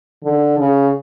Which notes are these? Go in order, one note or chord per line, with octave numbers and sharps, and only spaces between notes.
D3
C#3